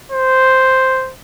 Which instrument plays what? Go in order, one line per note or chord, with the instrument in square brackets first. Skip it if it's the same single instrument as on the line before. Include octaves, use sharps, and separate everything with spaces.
[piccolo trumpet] C5